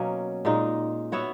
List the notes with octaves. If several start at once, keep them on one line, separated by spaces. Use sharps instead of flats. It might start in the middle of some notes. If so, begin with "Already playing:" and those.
Already playing: B2 F#3 A#3 C#4
A#2 G#3 D#4
B3 F#4 C#5 E5